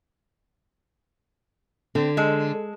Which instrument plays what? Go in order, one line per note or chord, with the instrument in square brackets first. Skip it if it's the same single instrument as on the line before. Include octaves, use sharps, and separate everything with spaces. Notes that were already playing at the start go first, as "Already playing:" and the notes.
[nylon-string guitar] D3 [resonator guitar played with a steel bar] C4
[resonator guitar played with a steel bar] G#3 A4